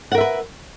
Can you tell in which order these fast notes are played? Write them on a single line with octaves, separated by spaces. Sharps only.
F#5 A#4 E5 B4